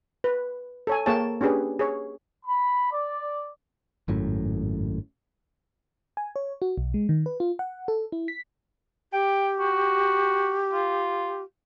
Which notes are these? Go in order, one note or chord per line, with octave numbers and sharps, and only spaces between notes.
B4
A4 C#5 G#5
A#3 G#4 C#5 G5 A5
C#4 D4 G4 G#4 B4
G#4 C#5
B5
D5
G#1 F#2 A2
G#5
C#5
F#4
B1
G#3
D#3
B4
F4
F#5
A4
E4
B6
G4 G5
F#4
F4